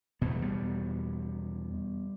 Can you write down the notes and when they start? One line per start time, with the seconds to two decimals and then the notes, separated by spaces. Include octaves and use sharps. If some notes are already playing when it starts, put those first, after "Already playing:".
0.21 E2 B2 B3
0.31 A3
0.42 G3 B3